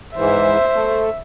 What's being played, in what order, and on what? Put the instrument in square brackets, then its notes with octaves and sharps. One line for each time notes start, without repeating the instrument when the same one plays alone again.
[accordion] G#2 E3 [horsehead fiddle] C5 [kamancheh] E5
[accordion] A3